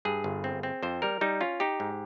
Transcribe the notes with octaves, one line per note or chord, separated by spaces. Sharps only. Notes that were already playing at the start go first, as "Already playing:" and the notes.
G2 G#4
G1
C4
C4
F2 C5
G3 A#4
G3 D#4
C#4 F4
D#4 G4
G#2